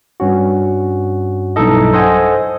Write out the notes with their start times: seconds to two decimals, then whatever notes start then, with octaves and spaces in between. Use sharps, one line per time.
0.20 G2 C#4 F#4
1.56 B1 G2 D#4 E4 A4 D#5
1.93 A4 C5 D#5 F#5 G#5